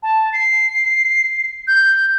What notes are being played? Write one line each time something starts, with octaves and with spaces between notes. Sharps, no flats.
A5
C7
G6